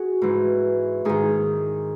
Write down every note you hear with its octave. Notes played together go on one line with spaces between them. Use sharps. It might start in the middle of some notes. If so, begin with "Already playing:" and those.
Already playing: F#4 G#4
G#2 E3
G#2 D#3 G#4